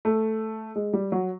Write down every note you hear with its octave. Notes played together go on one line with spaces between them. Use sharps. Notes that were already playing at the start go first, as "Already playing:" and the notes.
A3
G#3
G3
F#3